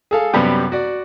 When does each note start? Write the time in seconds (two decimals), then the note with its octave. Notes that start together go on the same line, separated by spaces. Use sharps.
0.11 G#4 A4 F5
0.33 F#2 C3 G3 B3 G4
0.72 F#4 D5